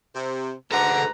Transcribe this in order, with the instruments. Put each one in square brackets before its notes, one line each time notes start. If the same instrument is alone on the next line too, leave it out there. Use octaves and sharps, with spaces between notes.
[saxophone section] C3
[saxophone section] D2 G#2 B4 [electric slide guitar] A4 F#5 [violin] A#5